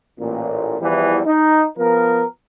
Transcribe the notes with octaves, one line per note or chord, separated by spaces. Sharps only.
A1 A#2
E2 E3 F3 G3
D#4
F3 B3 A#4